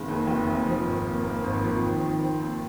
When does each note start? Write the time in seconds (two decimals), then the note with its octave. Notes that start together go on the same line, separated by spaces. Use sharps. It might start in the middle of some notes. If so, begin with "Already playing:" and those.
Already playing: F1 D#3 G#3
0.08 D#2
0.27 F1
0.47 F1
0.67 F3
0.86 G#1
1.05 A#3
1.24 A#3
1.44 G#1
1.63 F3
1.82 D#3
2.01 D#3
2.20 C4
2.40 D#2